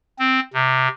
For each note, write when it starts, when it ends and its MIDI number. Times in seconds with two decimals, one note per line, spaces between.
0.19 0.40 60
0.54 0.88 48